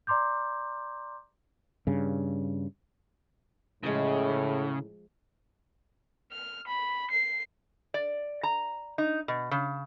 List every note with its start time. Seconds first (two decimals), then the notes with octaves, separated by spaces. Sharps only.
0.07 D5 A#5 C6 D6 G6
1.87 G2 C#3
3.83 A2 C#3 F3 G#3
6.32 F6
6.67 B5
7.11 C7
7.94 D5
8.43 A#5
8.98 D#4
9.28 B2
9.51 C#3